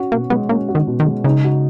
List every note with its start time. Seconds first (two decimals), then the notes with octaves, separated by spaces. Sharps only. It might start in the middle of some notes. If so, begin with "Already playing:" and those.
Already playing: C#4 F#4
0.12 B2 A#3
0.30 G#3 B3
0.49 A#3 C#4
0.69 F#4
0.75 D#3
0.87 B2
1.00 D#3
1.06 G#3
1.24 C#3 D#4
1.44 F#4